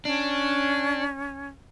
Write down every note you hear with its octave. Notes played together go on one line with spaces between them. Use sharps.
C#4 D4